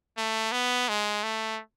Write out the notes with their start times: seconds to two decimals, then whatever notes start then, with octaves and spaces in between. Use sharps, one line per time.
0.17 A3
0.52 B3
0.88 G#3
1.23 A3